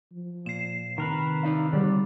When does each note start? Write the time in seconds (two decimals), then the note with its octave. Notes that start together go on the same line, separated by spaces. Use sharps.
0.13 F3
0.46 A#2 C7 E7
0.98 C3 D#3 A#4 B4
1.43 D#4 D5 F5
1.73 D3 G3 G4 D5